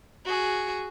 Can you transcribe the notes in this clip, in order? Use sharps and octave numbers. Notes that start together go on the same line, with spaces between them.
F#4 G#4